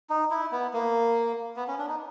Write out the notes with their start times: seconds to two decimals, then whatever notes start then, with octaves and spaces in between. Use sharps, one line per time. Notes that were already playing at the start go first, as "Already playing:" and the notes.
0.10 D#4
0.31 E4
0.52 B3
0.73 A#3
1.56 B3
1.68 C#4
1.79 D4
1.88 D#4